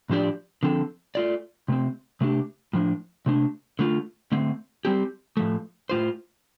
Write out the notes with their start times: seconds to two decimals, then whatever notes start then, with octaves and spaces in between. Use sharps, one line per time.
0.10 A2 F3 D4 G4 D5
0.63 D3 F3 C4 A4
1.15 A3 F4 D5
1.68 C3 A3 C4
2.21 C3 A3 D4 G4
2.73 A2 F3 D4
3.26 C3 A3 D4
3.79 D3 A3 F4
4.32 D3 A3 C4
4.85 G3 C4 G4
5.37 A2 F3 A3
5.89 A2 G3 F4 C5